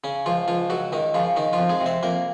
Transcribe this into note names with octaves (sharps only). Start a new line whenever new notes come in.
C#3 C#4
C#2 F3 F4
C#2 F3 F4
C#2 F#3 F#4
C#2 D#3 D#4
C#3 F3 F4
D#3 D#4
F3 F4
F2
G#3 G#4
C3
C4 C5
F2 A#3 A#4